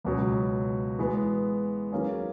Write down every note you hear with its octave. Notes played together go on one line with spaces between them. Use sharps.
C#2 B2 F#3 C#4
E3 G#3 B3
D#3 F#3 A#3 C#4 G#4